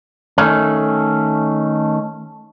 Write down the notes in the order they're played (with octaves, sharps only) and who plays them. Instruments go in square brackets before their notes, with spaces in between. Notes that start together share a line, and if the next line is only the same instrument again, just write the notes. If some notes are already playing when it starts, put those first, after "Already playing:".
[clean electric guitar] D#3 A3 C#4